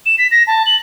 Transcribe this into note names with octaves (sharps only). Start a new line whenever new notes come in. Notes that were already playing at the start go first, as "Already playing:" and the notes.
E7
B6
A#6
A5
F#7